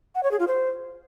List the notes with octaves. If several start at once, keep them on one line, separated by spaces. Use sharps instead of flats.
F#5
C#5
G#4
F4
C5